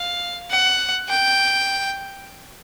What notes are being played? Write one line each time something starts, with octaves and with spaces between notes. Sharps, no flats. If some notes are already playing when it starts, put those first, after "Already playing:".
Already playing: F5
F#5
G5